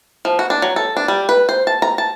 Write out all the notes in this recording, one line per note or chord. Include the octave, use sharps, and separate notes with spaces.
F3
F#4
D4
F#3
A4
D4
G3
B4
C5
A5
A#5
A5